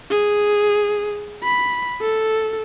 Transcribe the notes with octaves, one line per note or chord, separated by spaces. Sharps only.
G#4
B5
A4